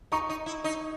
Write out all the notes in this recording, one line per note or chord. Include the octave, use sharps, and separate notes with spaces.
D#4 A#5 C#6
D#4
E4
D#4